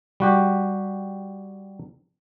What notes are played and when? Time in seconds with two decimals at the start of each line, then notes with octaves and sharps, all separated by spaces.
0.20 G3 F#4 G4